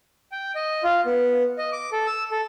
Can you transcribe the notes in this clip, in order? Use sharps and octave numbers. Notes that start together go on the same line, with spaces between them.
G5
D#5
F4
B3
D#5
D6
A4
E6
A4